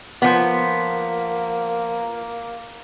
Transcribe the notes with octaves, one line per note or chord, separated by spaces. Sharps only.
F3 A#3 B3